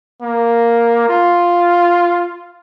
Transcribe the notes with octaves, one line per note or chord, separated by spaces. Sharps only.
A#3
F4